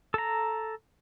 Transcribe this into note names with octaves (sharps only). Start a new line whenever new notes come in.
A4 A#5